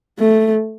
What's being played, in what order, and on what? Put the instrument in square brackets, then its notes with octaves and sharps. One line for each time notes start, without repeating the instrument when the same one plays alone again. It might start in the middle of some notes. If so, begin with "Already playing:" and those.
[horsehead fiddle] A3